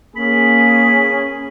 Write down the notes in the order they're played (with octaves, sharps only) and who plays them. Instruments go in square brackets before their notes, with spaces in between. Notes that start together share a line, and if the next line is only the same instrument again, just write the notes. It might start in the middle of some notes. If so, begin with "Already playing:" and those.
[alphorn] A#3 [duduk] C#4 [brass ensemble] G#4 [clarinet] B5